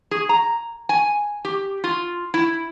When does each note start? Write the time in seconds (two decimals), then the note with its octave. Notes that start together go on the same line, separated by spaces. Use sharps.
0.11 G#4
0.29 A#5
0.89 G#5
1.45 G4
1.84 F4
2.34 E4